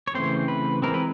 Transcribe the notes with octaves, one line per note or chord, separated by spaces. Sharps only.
C#5
C#3 E3 A3 C4 C5
B4
E3 G#3 C4 A#4
B4